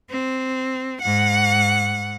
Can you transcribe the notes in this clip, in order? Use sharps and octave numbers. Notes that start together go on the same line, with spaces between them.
C4
G#2 F#5